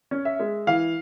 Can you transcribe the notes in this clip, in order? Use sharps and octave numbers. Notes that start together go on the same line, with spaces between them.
C#4
E5
G#3
E3 F5